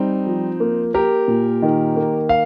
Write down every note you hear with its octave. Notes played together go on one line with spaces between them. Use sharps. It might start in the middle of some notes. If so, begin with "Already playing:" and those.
Already playing: G3 C4 D#4
F3
A#3
A#3 G4 A#4
A#2
D#3
A#3
F5